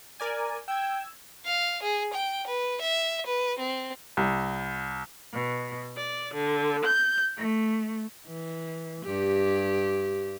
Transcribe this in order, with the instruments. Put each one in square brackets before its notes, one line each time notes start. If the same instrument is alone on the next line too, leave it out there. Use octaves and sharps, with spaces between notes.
[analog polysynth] A#4 D5 G#5
[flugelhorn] G5 [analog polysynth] E6 G#6
[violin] F5
G#4
G5
B4
E5
B4
C4
[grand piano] C2
[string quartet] B2
D5
D3
G6
A3
[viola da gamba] E3
G2 G4